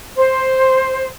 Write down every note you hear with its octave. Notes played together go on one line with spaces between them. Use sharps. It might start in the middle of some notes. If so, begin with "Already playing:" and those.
C5